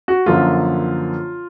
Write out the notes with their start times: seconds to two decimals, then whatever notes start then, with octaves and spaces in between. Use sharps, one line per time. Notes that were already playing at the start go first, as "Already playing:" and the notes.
0.08 F#4
0.26 F#2 D3 F3 A#3 F4